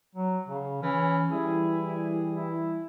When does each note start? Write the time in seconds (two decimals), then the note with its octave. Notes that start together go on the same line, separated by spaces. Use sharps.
0.15 F#3
0.48 C#3
0.83 E3 C#4
1.31 E3 G3 E4 G#4
2.35 E4